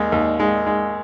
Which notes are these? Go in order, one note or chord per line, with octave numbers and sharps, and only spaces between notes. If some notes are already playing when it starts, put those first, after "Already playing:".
Already playing: D#2 G#3
D#2
G#3
G#3